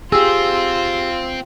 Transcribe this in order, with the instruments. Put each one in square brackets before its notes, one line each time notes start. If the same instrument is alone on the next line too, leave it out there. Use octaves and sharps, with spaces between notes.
[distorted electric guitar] C4 [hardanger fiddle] F4 [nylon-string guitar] G4 G#4 [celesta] E6